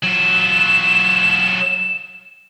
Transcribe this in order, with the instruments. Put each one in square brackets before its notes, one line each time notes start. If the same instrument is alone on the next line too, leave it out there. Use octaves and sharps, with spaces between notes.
[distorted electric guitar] F#3 F4 [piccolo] E7